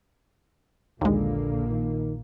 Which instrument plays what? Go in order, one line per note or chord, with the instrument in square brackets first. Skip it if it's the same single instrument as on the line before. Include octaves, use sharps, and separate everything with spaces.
[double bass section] A#1 A#3 [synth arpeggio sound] D#2 G#3 [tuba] D3
[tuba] D#3